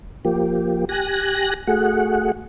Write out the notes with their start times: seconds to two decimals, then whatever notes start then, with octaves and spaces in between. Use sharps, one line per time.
0.25 F3 A#3 G4
0.89 G4 G#5 F#6 A#6
1.67 A3 F#4 G#4 F#5